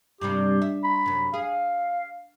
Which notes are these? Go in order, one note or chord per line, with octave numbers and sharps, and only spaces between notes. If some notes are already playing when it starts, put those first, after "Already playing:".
G2 C3 G3 G4
E5
B5
F#2 C3
G#4 F5